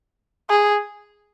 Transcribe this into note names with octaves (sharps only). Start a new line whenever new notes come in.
G#4